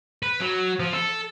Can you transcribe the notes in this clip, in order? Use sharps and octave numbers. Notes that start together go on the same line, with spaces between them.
B4
F#3
F3
A4